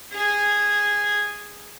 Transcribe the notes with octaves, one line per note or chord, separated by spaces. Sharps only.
G#4